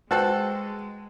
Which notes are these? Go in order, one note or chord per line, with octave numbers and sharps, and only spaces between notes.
G#3 F#4 A4 B4 C5 F#5 G5